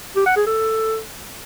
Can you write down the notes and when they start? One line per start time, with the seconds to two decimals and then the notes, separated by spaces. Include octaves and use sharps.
0.16 G4
0.26 F#5
0.36 G#4
0.46 A4